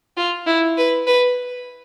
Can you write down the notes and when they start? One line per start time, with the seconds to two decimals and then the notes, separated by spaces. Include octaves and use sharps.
0.17 F4
0.46 E4
0.77 B4
1.07 B4